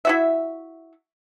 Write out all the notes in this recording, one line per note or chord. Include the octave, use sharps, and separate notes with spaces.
E4 F#4 E5